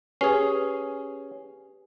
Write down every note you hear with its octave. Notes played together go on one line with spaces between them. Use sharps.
C#4 G4 G#4 B4 C7